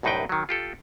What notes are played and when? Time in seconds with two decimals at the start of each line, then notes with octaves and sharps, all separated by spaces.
0.03 C2 F#2 A2 D#4 B4 G5
0.29 D#3 F#3
0.49 F4 G4 A4